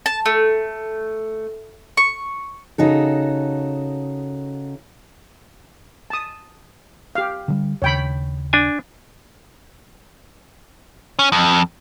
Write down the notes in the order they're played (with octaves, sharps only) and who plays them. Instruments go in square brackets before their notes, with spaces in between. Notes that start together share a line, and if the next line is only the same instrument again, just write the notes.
[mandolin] A5
A3
C#6
[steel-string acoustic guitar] C#3 D#4 F#4 A4
[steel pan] A5 D#6
G4 F5
[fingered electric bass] D3 E3 G3
[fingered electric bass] D#2 C#3 [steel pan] C#5 G5 B5
[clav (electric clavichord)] D4 G#5
[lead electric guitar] C#4
F2